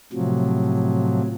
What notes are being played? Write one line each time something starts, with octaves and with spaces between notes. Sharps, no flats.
A2 C3 F3 F#3